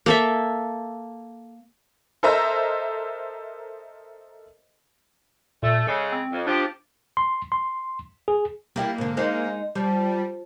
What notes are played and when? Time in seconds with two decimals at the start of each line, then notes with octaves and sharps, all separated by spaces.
0.06 A#3 A4 E5
2.23 A4 A#4 C5 D#5 E5 A#5
5.63 A#2 A3
5.87 C#3 G#3 A4
6.12 C4
6.33 F2
6.47 F3 D4 G4
7.17 C6
7.52 C6
8.28 G#4
8.76 G3 A#3 E4 G4
8.98 G#2 D3
9.17 G#3 D#4 C5
9.75 F3 G3